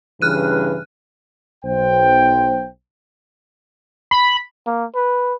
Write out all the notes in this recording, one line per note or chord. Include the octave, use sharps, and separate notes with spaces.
G2 C#3 E3 F6 F#6 D#7
B1 C5 G5
B5
A#3
B4